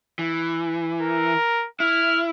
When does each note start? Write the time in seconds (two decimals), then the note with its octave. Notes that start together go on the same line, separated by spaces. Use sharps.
0.19 E3
1.01 A#4
1.80 E4 F6